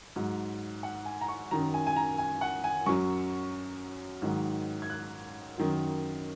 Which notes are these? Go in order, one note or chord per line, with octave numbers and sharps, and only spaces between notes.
G#2 F#3
F#5
G#5
A#5
C#6
F#2 D#3 F#3 A#5
G#5
G#5
A#5
G#5
F#5
G#5
F#2 F#3 C#6
G#2 D#3 F#3
G#6
F#6
F#2 D#3 F#3